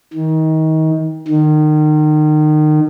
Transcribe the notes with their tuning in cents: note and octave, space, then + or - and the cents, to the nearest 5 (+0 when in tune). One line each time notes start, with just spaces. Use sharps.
D#3 +30
D#3 -30